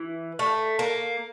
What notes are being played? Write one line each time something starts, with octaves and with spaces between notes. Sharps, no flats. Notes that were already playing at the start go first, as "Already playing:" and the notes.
Already playing: E3
A3
A#3